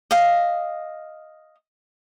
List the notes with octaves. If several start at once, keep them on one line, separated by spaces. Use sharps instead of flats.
D#5 F5